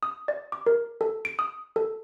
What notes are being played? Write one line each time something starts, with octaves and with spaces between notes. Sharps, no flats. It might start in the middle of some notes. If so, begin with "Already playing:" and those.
D#6
D5
D6
A#4
A4
D7
D#6
A4